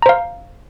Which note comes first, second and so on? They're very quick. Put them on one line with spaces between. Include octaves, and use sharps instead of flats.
A#5 C5 F5